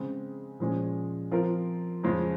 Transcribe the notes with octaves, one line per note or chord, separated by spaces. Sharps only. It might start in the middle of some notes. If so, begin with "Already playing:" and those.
Already playing: C#3 G#3 C4
A#2 F3 G#3 C#4 G#4
F3 C4 F4 A#4
F2 C#3 G#3 C#4 F4